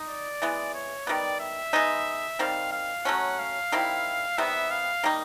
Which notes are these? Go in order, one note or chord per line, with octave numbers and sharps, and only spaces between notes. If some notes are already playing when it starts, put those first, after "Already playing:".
Already playing: D#4
D5
E3 G#3 B3
C#5
D#3 G3 B3 D5
E5
G#3 B3 D#4
D#3 G3 C4 F5
F5
F#3 A3 C#4 F#5
F5
D#3 G3 C4 E4
C3 D#3 G3 B3 E5
F5
D#3 G3 A#3 D#4